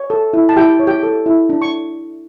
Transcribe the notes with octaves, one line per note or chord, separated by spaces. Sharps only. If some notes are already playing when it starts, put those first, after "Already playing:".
Already playing: C#5
A4
E4
A5
E4 G4 G5
C#5
G4 G5
A4
E4
D4
C#6